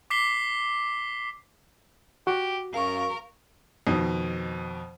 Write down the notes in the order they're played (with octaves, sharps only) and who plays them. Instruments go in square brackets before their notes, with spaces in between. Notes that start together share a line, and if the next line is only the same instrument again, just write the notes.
[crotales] D6 B6 C7 G7
[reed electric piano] F#4 [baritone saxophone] G4
[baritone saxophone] F#2 [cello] A#4 [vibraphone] F5 C#6
[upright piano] F2 B2 D#3